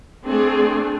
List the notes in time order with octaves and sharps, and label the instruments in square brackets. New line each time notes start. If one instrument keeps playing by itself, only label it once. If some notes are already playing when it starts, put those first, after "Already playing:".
[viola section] A3 C4 D4 G#4